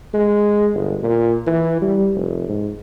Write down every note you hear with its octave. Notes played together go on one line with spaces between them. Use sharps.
G#3
G1
A#2
E3
G3
F1
G#2